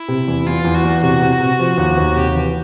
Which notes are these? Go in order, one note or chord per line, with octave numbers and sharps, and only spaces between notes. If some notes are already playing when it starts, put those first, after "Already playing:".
Already playing: E4
C3
E2
E2 F4
E2
F#4
E2
C3 F#4
C3
C3
F3
D#2
D#2
C3 G4
E3